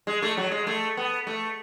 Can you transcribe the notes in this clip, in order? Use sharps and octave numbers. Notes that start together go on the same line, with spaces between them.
G#3
A3
F#3
G#3
A3
B3
A3